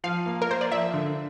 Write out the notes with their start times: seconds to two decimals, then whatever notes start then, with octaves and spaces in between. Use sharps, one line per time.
0.04 F3 F5
0.26 A#3
0.42 A#4
0.49 A#3 C5
0.61 D5
0.71 F3 E5
0.94 D3